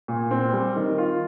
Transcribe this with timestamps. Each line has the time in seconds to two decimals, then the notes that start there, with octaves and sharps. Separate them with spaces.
0.08 A#2
0.31 C4
0.53 G3
0.76 D#3
0.98 F4